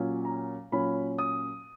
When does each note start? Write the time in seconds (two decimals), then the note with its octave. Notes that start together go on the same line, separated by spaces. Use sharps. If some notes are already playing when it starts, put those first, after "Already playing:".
Already playing: A#2 F#3 C#4
0.25 A#5
0.72 A#2 F#3 C#4 B5
1.18 D#6